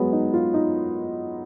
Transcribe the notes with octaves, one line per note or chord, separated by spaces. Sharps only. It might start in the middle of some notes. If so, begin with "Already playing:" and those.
Already playing: F#3 G#3 B3
D#4
F4
D#4